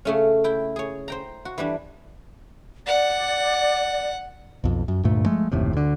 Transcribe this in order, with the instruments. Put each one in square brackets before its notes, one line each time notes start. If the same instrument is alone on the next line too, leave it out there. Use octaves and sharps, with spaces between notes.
[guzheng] C#3 A3 C#4
E4 G5
G#4 C#5
C5 G5 A#5
F#4
E3 G3 D4
[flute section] D5 [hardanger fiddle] F#5
[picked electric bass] B1 F2
F#2
D2 G2 A#2 A3
F3 G#3 A3
F#1 D#2 A2 C3
D2 D3